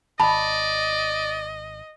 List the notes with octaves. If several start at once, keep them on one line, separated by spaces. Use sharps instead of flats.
G#1 D5 D#5 A5 B5